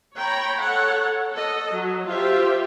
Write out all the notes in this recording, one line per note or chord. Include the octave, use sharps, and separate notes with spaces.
C#5 G5 A#5 B5
A4 C#5 F#5
A4 D#5
F#3
F4 G4 C5 E5